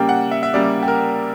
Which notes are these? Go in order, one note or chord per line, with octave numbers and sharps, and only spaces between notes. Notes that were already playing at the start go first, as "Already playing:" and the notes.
Already playing: C#3 G3 A#3 G5
F#5
E5
E5
C#3 G3 A#3 D5
G4
A#4